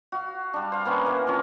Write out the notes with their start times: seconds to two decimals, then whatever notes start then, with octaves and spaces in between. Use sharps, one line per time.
0.12 F#4 F5
0.54 G3 D4
0.72 C5 F5
0.85 A#3 B3 C#4 F#5
1.05 E3 A#4 E5
1.27 F3 C4 C#4